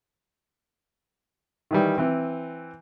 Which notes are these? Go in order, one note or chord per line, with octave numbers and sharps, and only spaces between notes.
D#3 E3 G3
E3 C4